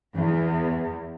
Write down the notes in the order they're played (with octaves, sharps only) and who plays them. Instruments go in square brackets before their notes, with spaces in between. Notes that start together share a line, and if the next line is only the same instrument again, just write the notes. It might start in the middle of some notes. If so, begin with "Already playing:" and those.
[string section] E2